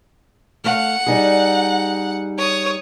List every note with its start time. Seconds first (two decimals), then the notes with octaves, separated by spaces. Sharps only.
0.64 A3 F5 F#5
1.07 G3 D#4 G#4
2.38 C#5 D#6